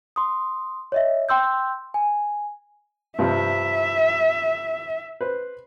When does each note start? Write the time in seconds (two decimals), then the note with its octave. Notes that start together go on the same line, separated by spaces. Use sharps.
0.16 C6 D#6
0.92 C#5 D#5 E5
1.29 G5 C6 E6 G6
1.94 G#5
3.19 G2 C3 F3 E5
5.21 B4 C5